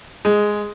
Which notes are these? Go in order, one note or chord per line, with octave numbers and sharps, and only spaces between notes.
G#3